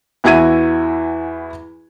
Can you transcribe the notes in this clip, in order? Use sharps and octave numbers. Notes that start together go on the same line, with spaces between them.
E2 E3 F#4 E5 G#6 D#7